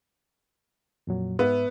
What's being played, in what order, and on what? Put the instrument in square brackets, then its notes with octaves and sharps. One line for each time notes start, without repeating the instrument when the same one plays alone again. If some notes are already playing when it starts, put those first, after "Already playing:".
[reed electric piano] F2 A#2 F#3
[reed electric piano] G#2 E5 [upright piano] B3